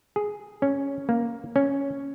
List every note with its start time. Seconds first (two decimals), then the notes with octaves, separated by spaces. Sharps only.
0.16 G#4
0.62 C#4
1.09 A#3
1.56 C#4